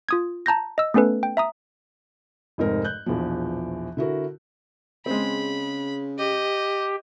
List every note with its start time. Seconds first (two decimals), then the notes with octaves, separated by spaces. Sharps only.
0.09 F4 D#6 G#6
0.46 A5 A#5 G6 A#6
0.78 D#5 E6
0.94 A3 B3 C#4 A4 B4
1.23 G5
1.37 E5 A#5 D#6
2.58 F1 G#2 C4 A#4
2.84 F#6 G6
3.06 A#1 E2 B2 F3
3.97 D3 E4 F#4 A#4
5.06 C#3 G#3 C4 B5
6.18 G4 D#5